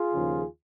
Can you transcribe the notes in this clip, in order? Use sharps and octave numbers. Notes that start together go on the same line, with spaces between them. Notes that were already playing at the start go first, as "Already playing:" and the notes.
Already playing: F4 G#4
D#2 C#3 F3